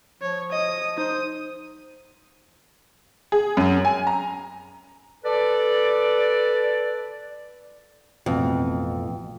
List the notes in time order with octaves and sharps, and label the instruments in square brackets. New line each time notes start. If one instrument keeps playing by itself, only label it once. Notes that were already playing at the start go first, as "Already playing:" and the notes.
[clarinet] F3 [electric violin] C#5
[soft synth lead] D#5 [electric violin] D#6
[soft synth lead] D#4 [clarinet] C5 [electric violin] D#6
[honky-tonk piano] G#4
F#2
G#5
A#5
[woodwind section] A4 B4 D5
[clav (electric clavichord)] A1 B2 [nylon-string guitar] F2